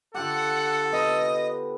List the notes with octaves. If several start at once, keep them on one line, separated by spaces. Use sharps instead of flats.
D3 F4 G4 A4 F#5
B3 D#5